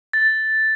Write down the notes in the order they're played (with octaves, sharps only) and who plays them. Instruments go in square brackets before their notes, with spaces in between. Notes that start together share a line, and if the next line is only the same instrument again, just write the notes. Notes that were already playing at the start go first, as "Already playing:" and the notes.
[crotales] A6